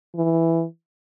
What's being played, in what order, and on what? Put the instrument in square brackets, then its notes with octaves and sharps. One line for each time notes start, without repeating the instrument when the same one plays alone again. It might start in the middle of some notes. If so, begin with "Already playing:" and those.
[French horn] E3